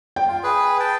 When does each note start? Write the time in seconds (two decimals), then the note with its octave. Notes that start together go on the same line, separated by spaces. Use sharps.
0.16 G5
0.28 F4
0.43 G#4 B4
0.80 G5 A5